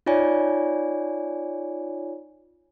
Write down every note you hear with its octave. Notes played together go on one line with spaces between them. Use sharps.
D#4 F4 C#5 D5 G#5